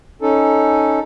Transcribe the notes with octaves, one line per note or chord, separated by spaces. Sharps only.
C#4 D#4 A4